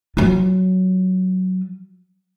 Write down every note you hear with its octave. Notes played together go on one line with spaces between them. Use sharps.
F#3 F4